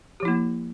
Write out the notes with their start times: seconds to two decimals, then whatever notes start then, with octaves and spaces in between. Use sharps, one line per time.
0.20 G4
0.23 F3
0.25 E4
0.28 A#3